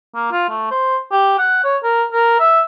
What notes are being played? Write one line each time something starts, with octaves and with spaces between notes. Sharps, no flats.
A#3
F4
A3
C5
G4
F#5
C#5
A#4
A#4
E5